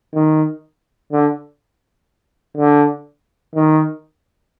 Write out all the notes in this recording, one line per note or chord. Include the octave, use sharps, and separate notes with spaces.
D#3
D3
D3
D#3